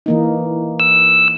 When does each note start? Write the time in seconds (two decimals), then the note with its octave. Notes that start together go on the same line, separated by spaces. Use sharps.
0.06 E3 A#3 D#4
0.80 E6